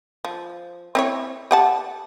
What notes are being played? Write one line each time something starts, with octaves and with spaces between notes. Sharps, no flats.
F3
C4 E4 C#5
G4 F#5 A5